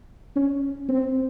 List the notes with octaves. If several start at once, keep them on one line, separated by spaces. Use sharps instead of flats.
C#4
C4